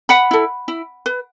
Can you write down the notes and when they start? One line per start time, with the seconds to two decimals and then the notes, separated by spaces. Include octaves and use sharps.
0.09 F#5 B5
0.31 E4 A4
0.68 E4
1.06 B4